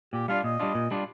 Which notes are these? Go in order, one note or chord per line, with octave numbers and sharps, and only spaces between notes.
A#2 G4
G3 D4 F4 F5
A#2 D#5
G3 D4 F4
A#2
G3 D4 F4